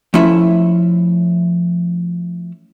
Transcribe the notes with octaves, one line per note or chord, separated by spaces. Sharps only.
F3 A3 C#4 E4 E5